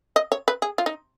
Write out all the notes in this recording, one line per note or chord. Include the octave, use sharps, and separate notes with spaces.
D#5
C#5
B4
G#4
F4
D#4